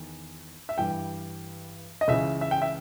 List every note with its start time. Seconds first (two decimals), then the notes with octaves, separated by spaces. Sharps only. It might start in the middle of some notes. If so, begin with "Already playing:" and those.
Already playing: E2 D#3
0.69 E5
0.78 G2 E3 G3 G5
2.01 D#5
2.08 C#2 C#3 E3 E5
2.41 E5
2.51 G5
2.62 E5